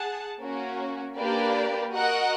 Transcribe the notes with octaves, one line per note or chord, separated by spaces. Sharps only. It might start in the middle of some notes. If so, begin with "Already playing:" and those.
Already playing: G#4 F#5 A5
A#3 C#4 F#4
A#3 D4 G4 B4 D5
F#4 A#4 D#5 F#5